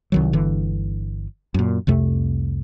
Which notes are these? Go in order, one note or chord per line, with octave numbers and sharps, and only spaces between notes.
C2 D#3 F#3
G1 D3 E3
F#2 A#2
C2 F2 C3 A3